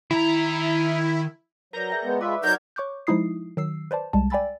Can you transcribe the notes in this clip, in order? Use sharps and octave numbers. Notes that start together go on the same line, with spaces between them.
D#3 E4 A#5
F#3 A#4 B4 D5 A#5 G6 A#6
G#4 E5 G5
G#3 B3 B4 D5
G#3 F4 B4 E5 C#6 D6
F#3 D#4 A#4 D5 F#5 G6 G#6
C#5 C#6 D6 F#6 G6
F3 G#3 D#4 E4 D#6 C7
D#3 F#3 E6 C7
B4 C5 D5 A5
C2 G3 G#3 A5
D5 G5 G#5 B5 E6 A6